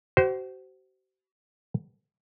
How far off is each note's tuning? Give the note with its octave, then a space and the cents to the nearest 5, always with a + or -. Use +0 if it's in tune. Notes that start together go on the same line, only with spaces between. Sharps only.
F#4 +40 C5 -10